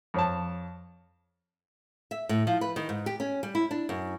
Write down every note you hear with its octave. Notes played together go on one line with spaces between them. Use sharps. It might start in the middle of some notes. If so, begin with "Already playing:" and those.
F2 C#5 A5
E5
A2
F3
B4
D#3
G#2
G4
C#4
G3
E4
D4
F#2